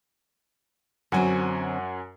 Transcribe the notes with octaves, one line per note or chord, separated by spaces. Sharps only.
F#2 D3 F#3 C4 F#5 G#5